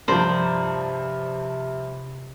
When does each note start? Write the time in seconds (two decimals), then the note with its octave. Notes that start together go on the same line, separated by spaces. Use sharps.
0.08 G2 C3 F3 C5 D5 A#5